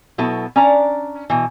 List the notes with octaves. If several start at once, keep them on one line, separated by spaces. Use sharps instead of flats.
B2 F#3 B3 E4 A4
C#4 D4 D5 A#5
B2 E3